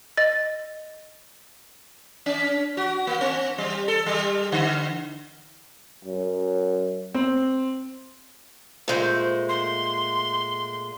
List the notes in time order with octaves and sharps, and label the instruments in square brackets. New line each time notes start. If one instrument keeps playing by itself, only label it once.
[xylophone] D#5 A6
[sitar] C#4
F#4
A#3
C4
G3
A4
G3
D3
[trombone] F#2
[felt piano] C4
[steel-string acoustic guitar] A#2 G#3 A3 [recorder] C5
[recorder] C6